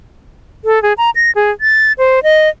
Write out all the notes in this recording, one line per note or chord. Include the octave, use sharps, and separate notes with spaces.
A4
G#4
A#5
A#6
G#4
A6
C5
D#5